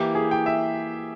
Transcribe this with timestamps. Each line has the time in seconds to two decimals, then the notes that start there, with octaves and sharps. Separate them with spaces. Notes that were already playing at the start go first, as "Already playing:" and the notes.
Already playing: E3 A#3 E4 G4
0.15 G#4
0.31 G5
0.46 E5